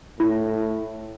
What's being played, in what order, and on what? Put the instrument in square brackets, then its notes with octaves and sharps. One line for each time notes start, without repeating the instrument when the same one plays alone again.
[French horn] A2 [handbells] E4